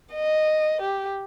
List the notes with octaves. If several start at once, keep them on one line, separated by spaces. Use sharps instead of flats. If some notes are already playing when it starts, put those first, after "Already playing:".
D#5
G4